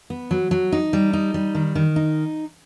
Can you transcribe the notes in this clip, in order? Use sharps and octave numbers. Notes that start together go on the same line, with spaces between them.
B3
F#3
F#3
D#4
G3
D#4
G3
D#3
D#3
D#4